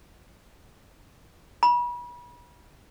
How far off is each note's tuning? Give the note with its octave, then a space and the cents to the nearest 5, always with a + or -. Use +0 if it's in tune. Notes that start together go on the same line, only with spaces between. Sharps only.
B5 -35